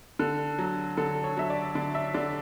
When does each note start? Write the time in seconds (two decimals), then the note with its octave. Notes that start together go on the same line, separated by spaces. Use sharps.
0.19 D3 A4
0.58 F#3
0.97 D3 A4
1.24 C#5
1.37 F#3 E5
1.50 D5
1.75 D3 D5
1.95 E5
2.14 D3 D5